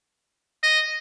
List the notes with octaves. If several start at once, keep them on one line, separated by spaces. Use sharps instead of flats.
D#5